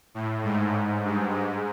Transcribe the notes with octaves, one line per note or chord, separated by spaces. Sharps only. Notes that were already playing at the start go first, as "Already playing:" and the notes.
A2
G#2
G2
G#2